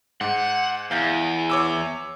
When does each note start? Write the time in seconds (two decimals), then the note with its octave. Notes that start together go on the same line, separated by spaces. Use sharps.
0.21 G#2 F#5
0.91 E2 F5 G6
1.50 C#5 D6 E6